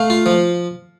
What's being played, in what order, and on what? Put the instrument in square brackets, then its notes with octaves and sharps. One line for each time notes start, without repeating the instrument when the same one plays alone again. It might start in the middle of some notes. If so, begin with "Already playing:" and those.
Already playing: [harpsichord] A3 [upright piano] F5
[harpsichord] F4
F3